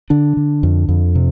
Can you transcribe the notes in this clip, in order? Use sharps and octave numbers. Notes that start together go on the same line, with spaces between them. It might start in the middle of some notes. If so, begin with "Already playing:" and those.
D3 D4
D3
F2
F2
C3